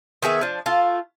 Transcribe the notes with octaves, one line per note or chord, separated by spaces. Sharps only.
D#3 B3 G#4 E5
F3 D4
A3 F4